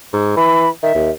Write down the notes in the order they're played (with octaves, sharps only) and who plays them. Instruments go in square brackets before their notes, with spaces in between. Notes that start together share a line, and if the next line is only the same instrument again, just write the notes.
[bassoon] G#2
[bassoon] E3 [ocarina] B5
[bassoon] D#3 [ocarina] E5
[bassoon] D#2